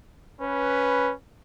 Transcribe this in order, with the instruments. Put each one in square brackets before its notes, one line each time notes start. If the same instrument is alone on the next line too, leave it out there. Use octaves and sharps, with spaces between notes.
[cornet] C#4 [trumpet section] B4